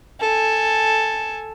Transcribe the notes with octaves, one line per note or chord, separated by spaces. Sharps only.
A4 G#5